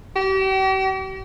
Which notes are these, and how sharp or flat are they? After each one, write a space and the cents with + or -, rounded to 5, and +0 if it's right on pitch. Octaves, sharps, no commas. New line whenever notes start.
G4 -40